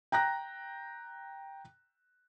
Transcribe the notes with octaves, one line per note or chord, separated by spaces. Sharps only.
G5 A#5 F#6 A#6